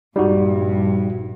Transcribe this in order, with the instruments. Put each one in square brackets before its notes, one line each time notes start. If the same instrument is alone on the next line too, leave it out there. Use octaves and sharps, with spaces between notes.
[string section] A#1 G2 [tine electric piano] G3 D#4 F#4